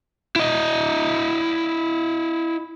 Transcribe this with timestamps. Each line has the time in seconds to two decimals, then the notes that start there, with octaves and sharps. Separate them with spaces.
0.36 E4 D#5